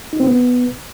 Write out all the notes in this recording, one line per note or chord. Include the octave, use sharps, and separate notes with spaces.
D#4
C4
B3